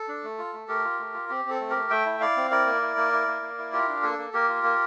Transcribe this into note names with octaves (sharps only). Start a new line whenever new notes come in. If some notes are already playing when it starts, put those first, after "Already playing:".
Already playing: A4
D4
A3
F4
A3
A3 G4 A#4
F4
A3
F4
C4 G4
C4 A4
A3
G4 A#4
A3
A3 E5 G5
E4
E4 D5 F5
C4
E4 A#4 D5
A#3
E4
A#3
E4
A#3
A#3
E4
F4 G4 A#4
D4
A#3 A4
A#3
A#3 G4 A#4
F4
A#3